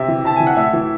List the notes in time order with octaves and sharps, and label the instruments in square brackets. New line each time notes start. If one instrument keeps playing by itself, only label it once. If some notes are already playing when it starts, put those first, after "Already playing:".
Already playing: [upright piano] C3 E5
E3
C3 A5
E3 G#5
F#5
A2 E5
E3